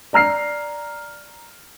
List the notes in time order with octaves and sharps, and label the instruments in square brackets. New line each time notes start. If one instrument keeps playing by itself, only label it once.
[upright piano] D5 A#5 F6 C7